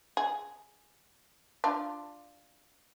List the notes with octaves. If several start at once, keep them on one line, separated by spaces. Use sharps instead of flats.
G#4
D4 F4